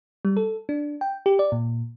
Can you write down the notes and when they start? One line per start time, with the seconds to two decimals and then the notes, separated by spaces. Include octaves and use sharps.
0.25 G3
0.37 A4
0.69 D4
1.01 G5
1.26 G4
1.39 D5
1.52 A#2